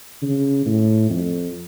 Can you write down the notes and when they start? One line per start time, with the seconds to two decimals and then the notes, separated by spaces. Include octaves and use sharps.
0.22 C#3
0.66 A2
1.10 F2